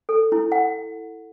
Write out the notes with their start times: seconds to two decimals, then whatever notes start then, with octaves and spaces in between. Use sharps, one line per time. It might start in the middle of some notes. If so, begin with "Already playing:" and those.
0.09 A4
0.32 E4
0.52 F#5